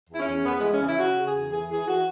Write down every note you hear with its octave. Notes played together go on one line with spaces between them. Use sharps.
E2 E4
C#4
E2
E2 B3
E3 G#3
C#4
C#3
E4
C#3 F#4
C#3
G#4
E2
E3 G#4
E3 G#4
E3 F#4